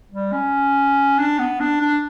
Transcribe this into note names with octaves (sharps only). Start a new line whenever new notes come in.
G3
C#4
D4
B3
D4
D4